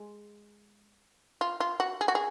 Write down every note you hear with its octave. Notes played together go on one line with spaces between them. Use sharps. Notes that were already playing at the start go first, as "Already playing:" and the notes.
Already playing: G#3
F4
F4
F#4
G#4
F#4
G#4